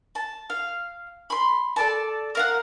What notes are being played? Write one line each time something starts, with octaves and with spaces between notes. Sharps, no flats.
A5
F5
B5 C6
A4 D5 A5
A#4 F5 F#5